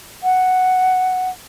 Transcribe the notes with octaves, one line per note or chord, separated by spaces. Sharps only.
F#5